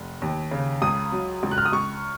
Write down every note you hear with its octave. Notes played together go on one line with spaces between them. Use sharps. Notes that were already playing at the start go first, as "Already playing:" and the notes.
Already playing: F1
D#2
C#3
C#2 D#6
F#3
C#2
F#6
F6
D#6
C#2 C#6